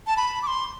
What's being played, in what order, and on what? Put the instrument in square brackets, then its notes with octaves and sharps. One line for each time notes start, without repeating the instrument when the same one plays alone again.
[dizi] A5
B5
D6
C6